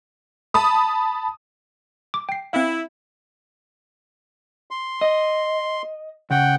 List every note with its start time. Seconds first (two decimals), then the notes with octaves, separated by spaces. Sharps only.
0.54 A5 B5 D#6
2.14 D6
2.29 G5 C7
2.53 C4 E4 F5
4.71 C6
5.01 D#5
6.31 C#3 F#5 G5